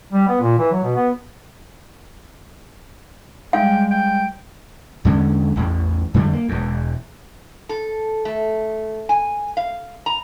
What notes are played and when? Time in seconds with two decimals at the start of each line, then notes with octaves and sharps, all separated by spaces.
0.11 G3
0.28 B3
0.41 A#2
0.59 E3
0.72 F#3
0.83 B2
0.96 B3
3.53 G3 G#3 F5 G5
3.91 G5
5.05 E2 D3 G#3 C#4
5.56 D1 A1 E2
6.14 F2 D3 G3 G#3
6.33 A#3
6.49 E1 E2
7.69 A4
8.25 A3
9.09 G#5
9.57 F5
10.06 A#5